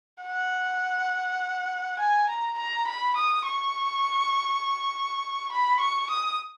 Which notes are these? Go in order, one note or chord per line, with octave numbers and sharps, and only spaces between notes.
F#5
G#5
A#5
A#5
B5
D#6
C#6
B5
C#6
D#6